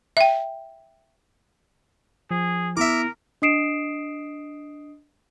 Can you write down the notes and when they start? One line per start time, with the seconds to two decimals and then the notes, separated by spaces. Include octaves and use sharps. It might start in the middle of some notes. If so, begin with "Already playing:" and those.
0.17 E5 G5
2.31 F3 G#4
2.77 B3 E4 A#4 E5 D6
3.42 D4 D#5 D#6 C7 D7 E7